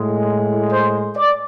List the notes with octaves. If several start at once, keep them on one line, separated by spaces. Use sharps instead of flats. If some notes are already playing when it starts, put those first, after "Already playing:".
Already playing: A2 G#3
C5
D5